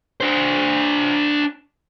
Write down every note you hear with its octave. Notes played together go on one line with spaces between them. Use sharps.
D4 C5